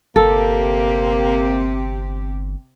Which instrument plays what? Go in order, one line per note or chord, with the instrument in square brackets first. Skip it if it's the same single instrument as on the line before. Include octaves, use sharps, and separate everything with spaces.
[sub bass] G1 [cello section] C3 C4 G4 [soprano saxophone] A#3 [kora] A4